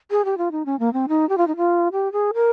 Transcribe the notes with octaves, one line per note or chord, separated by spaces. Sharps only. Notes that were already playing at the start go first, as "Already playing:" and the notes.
G#4
G4
F4
D#4
C#4
A#3
C4
D#4
G4
F4
D#4
F4
G4
G#4
A#4